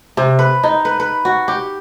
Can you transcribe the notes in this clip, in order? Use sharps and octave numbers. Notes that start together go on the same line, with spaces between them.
C3
B4
D#4
B4
B4
F#4
G4